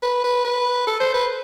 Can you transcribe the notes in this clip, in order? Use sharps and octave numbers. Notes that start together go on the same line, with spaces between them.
B4
B4
B4
A4
C5
B4